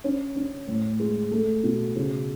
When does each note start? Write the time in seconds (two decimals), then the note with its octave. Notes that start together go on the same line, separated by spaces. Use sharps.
0.04 C#4
0.36 C#4
0.67 A2
1.00 G#3
1.31 A3
1.64 B2
1.96 C#3